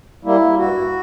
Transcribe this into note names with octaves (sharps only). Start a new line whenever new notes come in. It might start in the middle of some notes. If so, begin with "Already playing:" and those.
G3 A#3 E4
G2 F#4